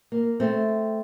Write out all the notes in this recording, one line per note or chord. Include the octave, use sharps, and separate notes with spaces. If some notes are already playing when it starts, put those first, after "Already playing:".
A#3
A3 C4